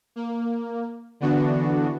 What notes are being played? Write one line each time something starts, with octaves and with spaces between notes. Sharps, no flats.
A#3
D3 E3 B3 D4 F#4